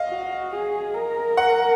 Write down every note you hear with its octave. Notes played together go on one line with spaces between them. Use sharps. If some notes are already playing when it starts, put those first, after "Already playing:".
Already playing: D#5 F5
F#4
G#4
A#4
F#5